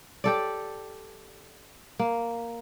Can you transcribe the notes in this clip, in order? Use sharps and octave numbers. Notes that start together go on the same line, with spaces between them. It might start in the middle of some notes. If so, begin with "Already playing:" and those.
G4 A4 D5
A#3